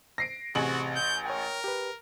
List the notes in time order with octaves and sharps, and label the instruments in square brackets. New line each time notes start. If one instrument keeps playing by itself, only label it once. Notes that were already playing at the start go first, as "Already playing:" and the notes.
[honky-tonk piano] A#6 C7 D7
[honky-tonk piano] A1 G#4 F#7 [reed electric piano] C3 [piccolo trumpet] F#4
[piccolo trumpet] G6
[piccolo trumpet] A#4 [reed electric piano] C#5 G5
[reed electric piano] G4 B4